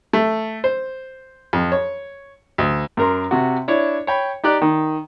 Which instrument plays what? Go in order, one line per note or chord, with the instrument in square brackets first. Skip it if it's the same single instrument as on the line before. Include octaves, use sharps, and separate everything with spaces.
[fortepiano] A3
C5
F2
C#5
D2
F#2 A#4 C6
C3 F#4
D4 E4 C#5
C#5 G5 B5
D#4 G4 D5 F#6
D#3